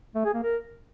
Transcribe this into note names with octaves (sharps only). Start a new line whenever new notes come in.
A3
G#4
A#3
A#4